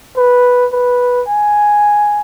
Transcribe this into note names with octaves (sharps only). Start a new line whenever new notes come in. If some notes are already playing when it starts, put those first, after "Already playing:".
B4
B4
G#5